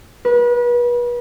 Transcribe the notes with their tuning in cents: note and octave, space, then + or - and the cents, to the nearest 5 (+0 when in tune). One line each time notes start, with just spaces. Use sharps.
B4 -35